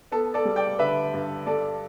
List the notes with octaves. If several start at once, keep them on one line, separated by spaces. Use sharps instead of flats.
B3 A4
A4 D5
G3
D5 G5
D3 B4 E5
G2
G3 A4 D5